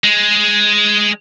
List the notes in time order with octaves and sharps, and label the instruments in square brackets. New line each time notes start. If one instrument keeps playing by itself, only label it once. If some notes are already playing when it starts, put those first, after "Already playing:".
[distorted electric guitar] G#3